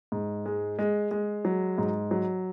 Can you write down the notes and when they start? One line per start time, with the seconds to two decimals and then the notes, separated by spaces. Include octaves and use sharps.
0.12 G#2
0.46 G#3
0.79 G#3
1.11 G#3
1.45 F#3
1.78 G#2
2.11 F#3